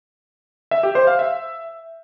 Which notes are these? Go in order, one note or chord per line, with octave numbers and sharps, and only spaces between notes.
E5
G4
C5
F5
E5